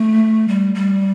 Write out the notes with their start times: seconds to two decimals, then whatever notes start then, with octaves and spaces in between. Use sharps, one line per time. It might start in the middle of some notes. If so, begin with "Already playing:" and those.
Already playing: A3
0.48 G3
0.75 G3